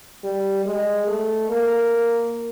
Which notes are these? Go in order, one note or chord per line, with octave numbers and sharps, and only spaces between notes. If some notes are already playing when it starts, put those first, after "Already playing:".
G3
G#3
A3
A#3